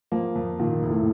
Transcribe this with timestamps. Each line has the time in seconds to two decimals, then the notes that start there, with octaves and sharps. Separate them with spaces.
0.12 F3 A#3
0.36 F2
0.59 A#2 D#3
0.83 F1
0.90 A2